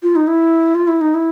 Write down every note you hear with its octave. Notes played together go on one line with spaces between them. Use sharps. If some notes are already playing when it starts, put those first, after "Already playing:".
F4
D#4
E4
F4
E4
D#4
E4